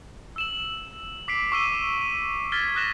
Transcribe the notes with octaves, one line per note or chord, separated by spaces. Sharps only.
E6 E7 F#7
D6 B6 C7 D7
C#6 D6 E6 C7 D#7 G7
D#7
F6 G#6 A6 B6 G7
D#6 F6 F#6 A#6 E7 G7